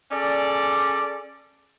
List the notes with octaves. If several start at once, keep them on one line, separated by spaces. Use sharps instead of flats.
C#4 G#4 A4 D5